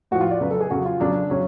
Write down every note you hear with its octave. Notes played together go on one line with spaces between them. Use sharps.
A2 F3 F#4
F4
D5
C#3 F#3 B4
A4
G#4
C#3 F#3 F#4
F4
C#3 F#3 D4
C#3 F#3 C#4